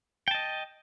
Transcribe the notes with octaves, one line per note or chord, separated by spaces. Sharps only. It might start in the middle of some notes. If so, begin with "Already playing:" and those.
D#5 G5 A5